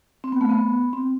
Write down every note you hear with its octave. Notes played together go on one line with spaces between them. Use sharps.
C4
B3
A3
B3
C4